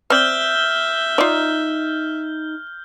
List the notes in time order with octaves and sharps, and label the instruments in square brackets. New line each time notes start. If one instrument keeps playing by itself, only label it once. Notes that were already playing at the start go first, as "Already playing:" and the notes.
[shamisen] C4 D5 [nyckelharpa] E5 [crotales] F6 G6 G7
[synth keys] D#4 [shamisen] F4 D5